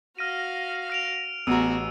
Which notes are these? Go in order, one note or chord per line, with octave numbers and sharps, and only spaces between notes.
F#4 F5 F6 A#6 D#7
F6 D7 F7
A1 B3 F#4 G#4 A#5 E6 D#7